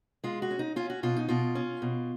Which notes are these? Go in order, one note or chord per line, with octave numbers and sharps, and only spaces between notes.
G#3 F4
F#4
C#4
D#4
C#4 F4
F#4
B2 F4
D#4
B2 F4
C#4
B2